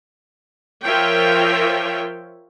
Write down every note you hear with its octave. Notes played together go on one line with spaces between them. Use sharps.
F3 F4 A#4 C#5 E5 G5